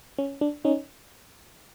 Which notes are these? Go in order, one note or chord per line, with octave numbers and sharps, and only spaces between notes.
C#4
D4
C#4 D#4